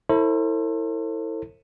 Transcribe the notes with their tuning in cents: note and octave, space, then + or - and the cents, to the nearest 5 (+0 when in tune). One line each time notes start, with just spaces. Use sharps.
E4 -15 A4 +40 C5 +35